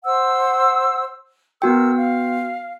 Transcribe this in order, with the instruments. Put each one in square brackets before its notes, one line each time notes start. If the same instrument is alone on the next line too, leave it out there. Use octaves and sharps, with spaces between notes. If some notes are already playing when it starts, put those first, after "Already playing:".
[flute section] C5 F#5 E6
[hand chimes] B3 F#4 G5 [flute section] A#4 E6
[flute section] F5